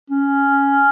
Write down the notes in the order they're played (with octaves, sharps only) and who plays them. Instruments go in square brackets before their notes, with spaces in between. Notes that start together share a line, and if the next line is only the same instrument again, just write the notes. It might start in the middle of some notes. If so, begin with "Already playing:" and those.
[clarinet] C#4